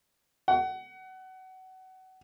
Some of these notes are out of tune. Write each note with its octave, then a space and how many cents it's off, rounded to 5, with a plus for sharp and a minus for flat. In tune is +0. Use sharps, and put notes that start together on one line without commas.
F#5 +25